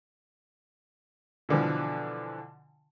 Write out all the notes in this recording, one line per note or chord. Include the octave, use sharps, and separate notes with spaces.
B2 D3 E3 F3